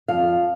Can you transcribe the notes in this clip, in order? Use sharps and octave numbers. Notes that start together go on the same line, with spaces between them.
F2 F5